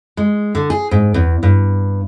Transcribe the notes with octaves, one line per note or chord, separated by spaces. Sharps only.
G#3
D3
G#4
G#2
E2
G2